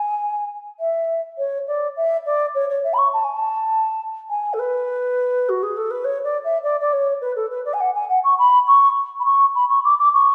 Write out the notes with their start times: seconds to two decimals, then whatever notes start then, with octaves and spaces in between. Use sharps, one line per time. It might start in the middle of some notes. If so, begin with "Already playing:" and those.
Already playing: G#5
0.79 E5
1.38 C#5
1.67 D5
1.96 E5
2.25 D5
2.54 C#5
2.69 C#5
2.84 E5
2.93 B5
2.98 C#6
3.13 A5
3.24 G#5
3.35 A5
4.30 G#5
4.53 A4
4.59 B4
5.49 F#4
5.63 G#4
5.77 A4
5.90 B4
6.04 C#5
6.24 D5
6.44 E5
6.63 D5
6.80 D5
6.93 C#5
7.21 B4
7.36 A4
7.50 B4
7.65 D5
7.73 G#5
7.80 F#5
7.94 G#5
8.09 F#5
8.24 C#6
8.38 B5
8.67 C#6
9.19 B5
9.25 C#6
9.55 B5
9.69 C#6
9.84 D6
9.98 D6
10.13 C#6